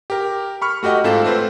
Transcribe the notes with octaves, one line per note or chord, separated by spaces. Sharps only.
G4 A#4
B5 C#6 F6
A3 F#4 G4 D#5 F#5
G#2 A3 C4 F4 A4 E7
A3 C4 B4 C5